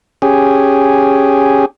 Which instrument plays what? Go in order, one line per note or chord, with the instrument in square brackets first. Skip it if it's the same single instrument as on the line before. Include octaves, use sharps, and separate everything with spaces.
[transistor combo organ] C#4 G4 G#4